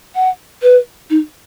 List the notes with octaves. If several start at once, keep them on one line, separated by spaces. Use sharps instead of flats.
F#5
B4
D#4